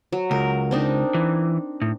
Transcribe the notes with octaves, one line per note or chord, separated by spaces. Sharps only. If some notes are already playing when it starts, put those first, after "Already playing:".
F#3
C#2 A#4
C4 D4 D#4
E3
A2